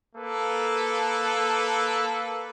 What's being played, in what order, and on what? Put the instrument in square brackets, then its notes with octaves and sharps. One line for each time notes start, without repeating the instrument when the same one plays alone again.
[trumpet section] A#3 A4 B4